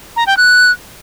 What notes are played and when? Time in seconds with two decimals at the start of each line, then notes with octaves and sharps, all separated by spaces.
0.16 A#5
0.27 G5
0.37 F#6